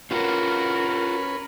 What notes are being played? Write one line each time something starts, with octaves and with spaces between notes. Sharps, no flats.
C#4 F4 F#4 A#4 B4